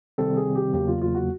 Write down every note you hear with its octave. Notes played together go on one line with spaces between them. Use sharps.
C3 D#3 G3 C4 A4
G#4
G4
E2 C#3 F#3 A#3 G4
F4
F4
F#4